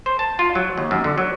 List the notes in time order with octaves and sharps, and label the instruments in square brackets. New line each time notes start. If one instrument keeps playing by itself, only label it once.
[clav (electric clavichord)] C5
A5
F4
F#3
D#2
F#2
D3
F#3